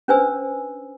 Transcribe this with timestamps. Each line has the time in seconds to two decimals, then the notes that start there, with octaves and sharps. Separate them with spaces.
0.08 C#4 D4 B4 C5 G#5 E6